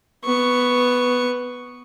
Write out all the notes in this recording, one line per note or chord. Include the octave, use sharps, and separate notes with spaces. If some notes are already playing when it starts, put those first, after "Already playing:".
B3 C#6